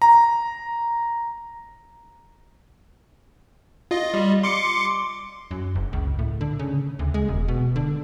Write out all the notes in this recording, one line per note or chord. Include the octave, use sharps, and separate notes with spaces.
A#5
F4 D#5
G3
C6 D6 C#7
F#2
F#1
C#2
A2
D3
C#3
D2
G#3
E1
B2
D3